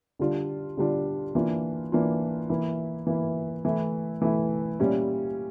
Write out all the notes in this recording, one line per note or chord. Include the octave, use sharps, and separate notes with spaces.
D3 G3 D4 F4
D3 G3 D4 F4
E3 A#3 D4 F4
E3 A#3 D4 F4
E3 A#3 E4
E3 A#3 E4
E3 A3 E4
E3 A3 E4
A#2 G3 C#4 E4